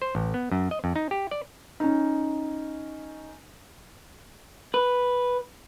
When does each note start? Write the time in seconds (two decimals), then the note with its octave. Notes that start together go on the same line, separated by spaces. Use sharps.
0.02 C5
0.15 A1
0.34 B3
0.52 F#2
0.71 D#5
0.84 F2
0.96 D#4
1.11 G4
1.31 D5
1.80 C#4 D#4
4.74 B4